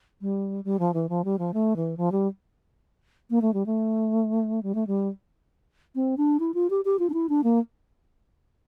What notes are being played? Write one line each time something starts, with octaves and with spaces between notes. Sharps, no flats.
G3
G3
F3
E3
F3
G3
F3
A3
E3
F3
G3
A#3
A3
G3
A3
G3
A3
G3
C4
D4
E4
F4
G4
G4
F4
D4
E4
D4
A#3